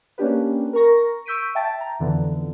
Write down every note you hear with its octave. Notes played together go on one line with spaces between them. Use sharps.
A#3 C#4 D4 G4 B4
A#4 A#5 C#6 A#6
C#6 E6 G6 B6 D7 D#7
E5 G5 A5 A6
A#5
F2 D3 E3 B3